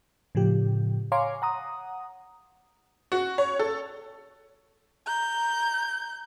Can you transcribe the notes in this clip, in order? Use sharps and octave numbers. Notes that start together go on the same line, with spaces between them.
A2 C#3 F3 G4
C#5 F5 G#5 A#5 C6 D6
F#5 A#5 D#6
F#4
C#5
A4
A#5 G6